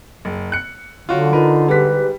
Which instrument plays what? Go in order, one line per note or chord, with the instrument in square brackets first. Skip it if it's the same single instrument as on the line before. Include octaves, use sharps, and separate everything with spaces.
[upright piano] F#1
F#6 C#7
[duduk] D3 [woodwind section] F#3 [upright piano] F4 F#4
[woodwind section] D#4 F4 [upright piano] A#4 B4
[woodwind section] G#2 G4 B4 [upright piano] G3 B6